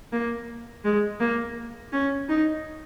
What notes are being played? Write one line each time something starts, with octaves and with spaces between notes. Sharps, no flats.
A#3
G#3
A#3
C#4
D#4